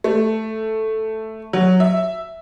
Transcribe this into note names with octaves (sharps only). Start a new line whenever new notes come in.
A3
F#3
E5